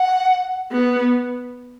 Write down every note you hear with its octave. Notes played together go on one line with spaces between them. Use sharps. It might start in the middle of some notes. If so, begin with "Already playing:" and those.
Already playing: F#5
B3